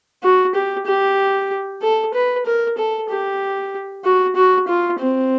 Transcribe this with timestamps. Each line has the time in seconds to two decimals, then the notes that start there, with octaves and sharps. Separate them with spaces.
0.23 F#4
0.55 G4
0.86 G4
1.82 A4
2.14 B4
2.46 A#4
2.77 A4
3.09 G4
4.04 F#4
4.36 F#4
4.68 F4
4.99 C4